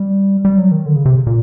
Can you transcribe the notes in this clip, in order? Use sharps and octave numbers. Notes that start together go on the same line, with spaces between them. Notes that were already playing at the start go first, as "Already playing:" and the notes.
Already playing: G3
G3
F#3
D#3
D3
C#3
C3
A#2